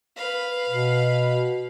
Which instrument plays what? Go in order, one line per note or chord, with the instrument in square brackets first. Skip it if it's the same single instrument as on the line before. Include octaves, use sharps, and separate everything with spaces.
[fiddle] B4 F5
[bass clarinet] B2